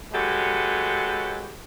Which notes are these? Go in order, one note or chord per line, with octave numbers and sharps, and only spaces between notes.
F#3 G#3 G4 A4 B4 C#5